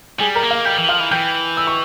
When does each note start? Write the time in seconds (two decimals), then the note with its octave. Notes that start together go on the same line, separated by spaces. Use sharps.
0.20 G3 G#4 G#5
0.35 A#4 A#5
0.43 A#3
0.50 F5 F6
0.65 G3 G5 G6
0.78 E3
0.89 F3 F5 F6
1.00 E3
1.11 E3 G5 G6
1.57 E6
1.67 C#6